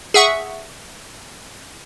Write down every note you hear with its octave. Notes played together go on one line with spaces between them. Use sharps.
G#4 E5 F#5 C#6